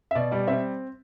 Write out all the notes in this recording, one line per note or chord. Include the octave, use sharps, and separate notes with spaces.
E5
B2 D5
G3 D5
C4 E5